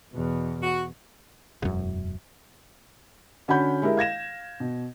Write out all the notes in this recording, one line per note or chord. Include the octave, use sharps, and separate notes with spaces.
E2 B2
F#4
E1 F#2
D3 C#4 F#4 F#5 B5 G6
G#3 E4 G4 A#4 E5
F5 G#6 A#6 E7
B2